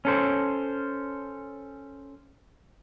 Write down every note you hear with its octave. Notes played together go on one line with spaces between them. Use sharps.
C#4 A4 C5